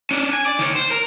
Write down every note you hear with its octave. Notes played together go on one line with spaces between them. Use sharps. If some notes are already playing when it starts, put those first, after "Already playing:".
C#4 D4
G#5
D5
D#3 C#5
C5
A#4